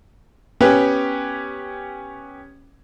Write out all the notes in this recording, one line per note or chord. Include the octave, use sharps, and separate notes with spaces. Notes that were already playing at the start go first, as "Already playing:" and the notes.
B3 C#4 G4 B4